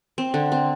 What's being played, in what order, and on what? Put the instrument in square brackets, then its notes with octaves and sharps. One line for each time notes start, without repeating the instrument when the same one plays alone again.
[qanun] C4
D3
C4